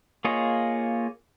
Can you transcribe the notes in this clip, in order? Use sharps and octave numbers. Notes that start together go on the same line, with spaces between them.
A#3 F4 G#4 C#5 D#5